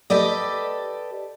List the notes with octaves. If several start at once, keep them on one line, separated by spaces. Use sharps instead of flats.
G4 A4 B4 D5 D#5